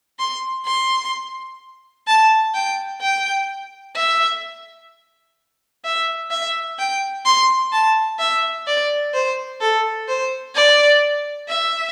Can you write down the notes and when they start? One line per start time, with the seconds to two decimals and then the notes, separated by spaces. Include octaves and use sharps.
0.19 C6
0.66 C6
2.07 A5
2.54 G5
3.01 G5
3.96 E5
5.84 E5
6.31 E5
6.79 G5
7.25 C6
7.72 A5
8.19 E5
8.67 D5
9.13 C5
9.61 A4
10.08 C5
10.55 D5
11.49 E5